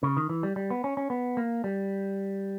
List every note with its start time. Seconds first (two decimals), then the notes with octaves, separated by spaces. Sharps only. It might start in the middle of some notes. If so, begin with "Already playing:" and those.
0.03 C#3
0.17 D#3
0.29 E3
0.43 G3
0.56 G3
0.71 B3
0.84 C#4
0.97 C#4
1.10 B3
1.37 A#3
1.64 G3